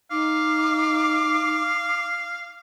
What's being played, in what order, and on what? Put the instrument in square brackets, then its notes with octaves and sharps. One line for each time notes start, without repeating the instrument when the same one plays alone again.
[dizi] D#4 [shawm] F5 [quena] D6